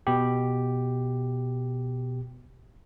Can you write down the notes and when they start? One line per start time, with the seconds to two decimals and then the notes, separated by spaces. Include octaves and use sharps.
0.07 B2 G4